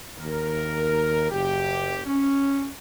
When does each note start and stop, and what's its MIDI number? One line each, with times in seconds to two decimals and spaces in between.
0.18 1.30 39
0.18 1.30 70
1.31 2.02 30
1.31 2.02 67
2.06 2.68 61